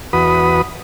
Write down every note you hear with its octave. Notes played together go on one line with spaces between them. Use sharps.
E2 F#4 B4 B5 D#6